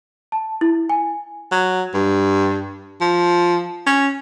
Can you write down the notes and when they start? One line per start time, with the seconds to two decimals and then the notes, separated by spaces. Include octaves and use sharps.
0.32 A5
0.61 E4
0.89 G#5
1.52 F#3
1.94 G2
3.01 F3
3.87 C#4